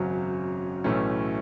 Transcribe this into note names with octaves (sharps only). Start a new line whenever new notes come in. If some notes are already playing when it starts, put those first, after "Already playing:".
Already playing: G#1 F#2 C#3 F#3 C#4
B1 A2 E3 A3 C#4